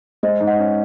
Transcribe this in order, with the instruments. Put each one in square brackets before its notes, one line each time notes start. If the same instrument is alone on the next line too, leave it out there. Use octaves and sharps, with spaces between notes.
[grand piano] G#3 [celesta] C5 D#5
[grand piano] G#2
[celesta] D#5 F#5
[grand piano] C#4